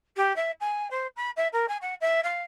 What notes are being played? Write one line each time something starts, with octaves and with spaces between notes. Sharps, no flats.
G4
E5
G#5
C5
B5
E5
A#4
G#5
F#5
E5
F5